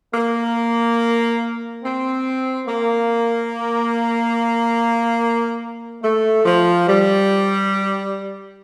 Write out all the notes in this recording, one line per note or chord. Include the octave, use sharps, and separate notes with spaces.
A#3
C4
A#3
A3
F3
G3